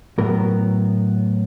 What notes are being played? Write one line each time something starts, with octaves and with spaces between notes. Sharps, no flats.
A2 F#3 B3 A#4